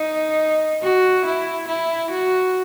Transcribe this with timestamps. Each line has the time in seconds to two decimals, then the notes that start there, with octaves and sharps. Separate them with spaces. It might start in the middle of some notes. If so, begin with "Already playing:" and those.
Already playing: D#4
0.83 F#4
1.25 E4
1.68 E4
2.11 F#4